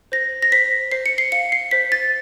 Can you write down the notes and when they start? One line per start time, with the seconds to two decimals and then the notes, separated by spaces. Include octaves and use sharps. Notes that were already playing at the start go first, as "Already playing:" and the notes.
0.12 C5 A#6
0.42 A#6
0.52 C5 B6
0.92 C5 C7
1.06 C#7
1.18 C7
1.32 F5 C#7
1.52 C7
1.71 C5 B6
1.92 A6